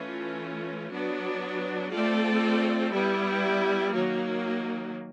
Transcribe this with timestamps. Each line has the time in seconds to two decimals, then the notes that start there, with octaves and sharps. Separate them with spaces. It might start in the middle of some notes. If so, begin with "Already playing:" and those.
Already playing: E3 A3 C#4 F4
0.91 F#3 B3 D4 F#4
1.92 A3 C4 F4 A4 D5
2.93 G3 B3 E4
3.93 D#3 F#3 A#3